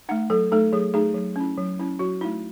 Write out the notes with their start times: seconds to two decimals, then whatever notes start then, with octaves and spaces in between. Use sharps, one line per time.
0.09 A3 D#4 F#5
0.30 F#3 A4
0.52 A3 D#4 A4
0.73 F#3 G#4
0.94 A3 D#4 G#4
1.15 F#3
1.36 C#4 E4
1.58 F#3
1.79 C#4 E4
1.99 F#3 F#4
2.21 A3 D#4 E4